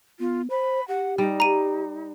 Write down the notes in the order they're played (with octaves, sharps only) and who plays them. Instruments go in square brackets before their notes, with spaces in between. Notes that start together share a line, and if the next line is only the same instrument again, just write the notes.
[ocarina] B3 [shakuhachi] F4
[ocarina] C5 [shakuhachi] B5
[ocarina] G4 [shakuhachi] F#5
[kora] G3 [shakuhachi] D#4
[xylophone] A#5 D#7